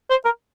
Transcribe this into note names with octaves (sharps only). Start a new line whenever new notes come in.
C5
A#4